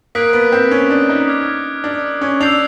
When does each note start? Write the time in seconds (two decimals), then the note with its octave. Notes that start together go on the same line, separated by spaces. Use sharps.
0.15 A#3 D#6 F#6 B6 D7
0.33 B3
0.52 C4
0.71 C#4
0.90 D4
1.09 D#4
1.27 D6 F6 G#6
1.84 D4
2.21 C#4
2.41 D4 E6 G6 C7 F7